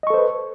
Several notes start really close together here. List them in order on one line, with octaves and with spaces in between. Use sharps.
D#5 C#6 A4 C5 B4